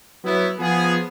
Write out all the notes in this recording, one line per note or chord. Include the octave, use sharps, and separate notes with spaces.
F#3 B3 E4
F3 B3 G#4